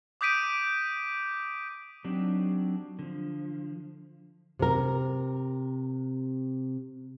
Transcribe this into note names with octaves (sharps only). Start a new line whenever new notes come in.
D6 D#6 G6 B6 D7 D#7
F#3 C4 D4 D#4 G4
D3 F3
C3 A#4